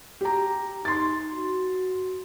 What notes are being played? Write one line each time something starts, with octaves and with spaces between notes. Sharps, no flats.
G4 A#5
D#4 C6 A6
F#4